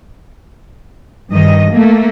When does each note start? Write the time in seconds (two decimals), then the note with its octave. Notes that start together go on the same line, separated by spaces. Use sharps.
1.31 G2 D#3 D#5
1.72 A3 A#3